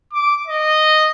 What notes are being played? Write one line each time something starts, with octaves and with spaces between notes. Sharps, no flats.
D6
D#5